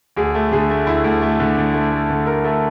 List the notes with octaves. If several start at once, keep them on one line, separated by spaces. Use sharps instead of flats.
D2 G#4
A3
D3 G#4
A3
D2 E4
D2
A3
D3
D3
A3
A3
D3
D2 A#4
A3 A4